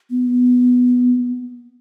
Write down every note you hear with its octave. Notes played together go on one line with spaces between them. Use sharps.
B3